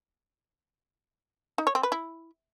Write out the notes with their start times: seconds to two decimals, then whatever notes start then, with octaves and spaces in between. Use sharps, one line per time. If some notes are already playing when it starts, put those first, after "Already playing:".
1.58 D#4
1.67 C#5
1.75 C4
1.83 B4
1.92 E4